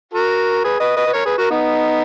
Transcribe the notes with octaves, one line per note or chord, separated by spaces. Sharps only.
F#4 A#4
G#4 B4
B4 D#5
B4 D#5
B4
A#4 C#5
G#4 B4
F#4 A#4
B3 D#4